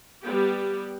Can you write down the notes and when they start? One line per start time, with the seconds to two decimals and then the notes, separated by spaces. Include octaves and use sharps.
0.21 G3 B3 G4